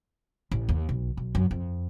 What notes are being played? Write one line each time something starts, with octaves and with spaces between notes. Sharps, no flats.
A1
D#2
B1
B1
F#2
F2